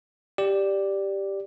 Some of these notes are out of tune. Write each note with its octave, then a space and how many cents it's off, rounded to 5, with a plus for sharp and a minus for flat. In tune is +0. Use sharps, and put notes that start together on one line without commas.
G4 +0 D5 +0